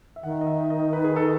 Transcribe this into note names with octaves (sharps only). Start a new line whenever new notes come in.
E5
D#3 F#5
D#5
E5
D#5
B4
G#4
A4